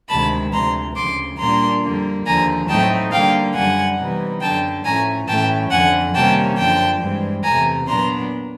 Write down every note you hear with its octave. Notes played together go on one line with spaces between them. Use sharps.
D2 C3 D#3 G#3 A5 B5
D2 C3 F3 A#5 C6
D2 C#3 F3 C6 D6
A#2 G3 A#3 D4 A#5 C6
F2 D3 G3 A#3
D#2 D3 F3 G#5 A#5
A2 F#3 A3 C4 D#4 G5 A5
D3 G3 A#3 F5 G5
F#2 D3 G3 F#5 G#5
C3 E3 G3 B3 D#4
F#2 D3 F#3 G5 A5
A2 F3 A3 C#4 G#5 A#5
A2 E3 A3 C#4 G5 A5
F2 D3 F3 F#5 G#5
C3 D#3 G3 A#3 C#4 G5 A5
F#2 D3 F3 G5 A5
G2 E3 G#3 C4
E2 C3 E3 A3 G#5 A#5
A#2 F#3 B3 D4 A#5 C6